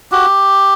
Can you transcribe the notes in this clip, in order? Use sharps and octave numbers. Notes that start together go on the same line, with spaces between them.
F#4 G4